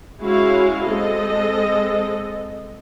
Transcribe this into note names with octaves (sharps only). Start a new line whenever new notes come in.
G#3 C#4 E4 F#4 C#5 F5
G#3 C4 A4 D#5